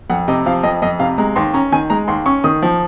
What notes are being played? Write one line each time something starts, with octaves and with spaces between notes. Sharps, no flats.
F2 F#5
C3 D#5
F3 F5
F2 D#5
F2 D#5
C3 F5
G#3 A#5
D#2 C6
C#4 A#5
D#3 G#5
G#3 A#5
D#2 C6
C#4 C#6
D#3 D#6
F3